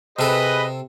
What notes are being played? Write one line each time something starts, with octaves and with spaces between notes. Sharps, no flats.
C3 G#4 A4 B4 D#5